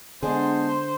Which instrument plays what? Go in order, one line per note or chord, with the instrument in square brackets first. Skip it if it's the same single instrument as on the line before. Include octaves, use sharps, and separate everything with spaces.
[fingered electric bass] D3 [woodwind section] G#3 B3 [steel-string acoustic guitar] D4 G#4 [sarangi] C5